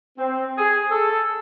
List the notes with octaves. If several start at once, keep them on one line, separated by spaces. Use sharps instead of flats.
C4
G#4
A4